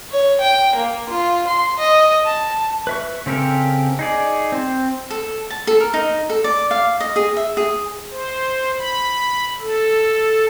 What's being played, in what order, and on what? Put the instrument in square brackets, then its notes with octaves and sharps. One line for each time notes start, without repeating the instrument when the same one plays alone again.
[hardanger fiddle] C#5
G5
A#3
F4
C6
D#5
A5
[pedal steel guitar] B4 E5 C#6
C#3 C4 G4 A4 A#4
D#4 G#4 D5
C4 C5
[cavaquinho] A4
A5
A4
A#4
D#4
A4
D5
F5
D#5
G#4
E5
G#4
[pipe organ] C5
B5
A4